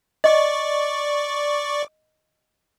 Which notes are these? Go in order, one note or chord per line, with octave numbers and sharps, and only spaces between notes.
D5 D#5 C#6 D6